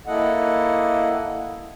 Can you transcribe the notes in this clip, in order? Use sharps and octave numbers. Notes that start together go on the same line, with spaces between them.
A#3 E4 A4 D#5 F#5